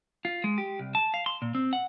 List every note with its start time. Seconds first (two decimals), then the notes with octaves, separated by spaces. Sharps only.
0.25 F4
0.44 G#3
0.58 G4
0.79 C2
0.95 A5
1.14 F5
1.26 C6
1.42 A#2
1.55 C4
1.73 F#5